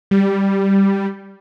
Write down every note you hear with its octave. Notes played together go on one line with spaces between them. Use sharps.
G3